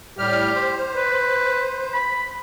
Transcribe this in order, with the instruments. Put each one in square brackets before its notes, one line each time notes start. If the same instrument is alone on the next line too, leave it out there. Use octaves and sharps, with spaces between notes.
[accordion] A2 G3 F6 [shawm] G4
[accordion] C5
[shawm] B4
B5